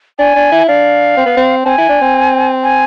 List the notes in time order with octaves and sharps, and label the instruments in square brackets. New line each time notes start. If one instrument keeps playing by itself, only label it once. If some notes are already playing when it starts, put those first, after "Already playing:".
[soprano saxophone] D4 [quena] G#5
[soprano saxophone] D4
E4
[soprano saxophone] D4 [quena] F5
[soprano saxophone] C4
B3
C4
[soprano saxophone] C4 [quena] G#5 A5
[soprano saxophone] E4
D4
C4
[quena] G#5